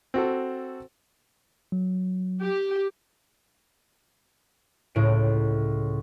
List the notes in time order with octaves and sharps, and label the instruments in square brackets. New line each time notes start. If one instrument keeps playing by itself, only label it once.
[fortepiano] C4 F#4 A4
[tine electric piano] F#3
[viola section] G4
[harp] C#2 A2 D7